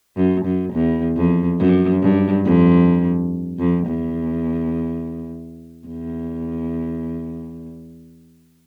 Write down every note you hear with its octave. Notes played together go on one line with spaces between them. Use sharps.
F#2
F#2
E2
F2
F#2
G2
F2
F2
E2
E2